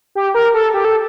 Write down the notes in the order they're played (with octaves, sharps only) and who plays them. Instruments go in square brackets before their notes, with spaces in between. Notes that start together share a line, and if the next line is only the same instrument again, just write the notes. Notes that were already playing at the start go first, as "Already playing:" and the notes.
[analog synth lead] G4
A#4
A4
G4
A4